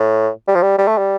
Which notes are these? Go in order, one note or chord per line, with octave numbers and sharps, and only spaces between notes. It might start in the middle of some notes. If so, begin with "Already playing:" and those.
Already playing: A2
G3
F3
G3
G3
A3
G3